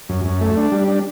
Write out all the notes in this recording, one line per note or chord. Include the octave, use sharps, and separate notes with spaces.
F#2
F#2
A3
D4
G3
D4